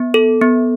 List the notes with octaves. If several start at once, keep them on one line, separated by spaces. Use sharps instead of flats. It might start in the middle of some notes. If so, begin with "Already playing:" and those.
Already playing: B3
A4
B3